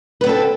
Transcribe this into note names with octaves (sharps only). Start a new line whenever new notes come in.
B3 C4 A4 B4